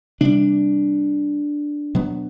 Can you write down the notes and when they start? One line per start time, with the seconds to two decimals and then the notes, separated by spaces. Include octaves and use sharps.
0.21 C3 G3 D4
1.95 B2 F#3 B3